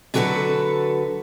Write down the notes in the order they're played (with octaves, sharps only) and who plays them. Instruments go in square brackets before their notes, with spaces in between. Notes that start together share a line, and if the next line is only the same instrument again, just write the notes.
[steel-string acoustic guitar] D3 F#3 F#4 G#4 A4 B4